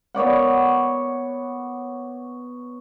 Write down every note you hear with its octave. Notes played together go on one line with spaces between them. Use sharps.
B3 C#5 D5 F#5